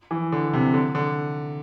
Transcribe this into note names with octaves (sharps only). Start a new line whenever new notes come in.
E3
D3
C3
D3
D3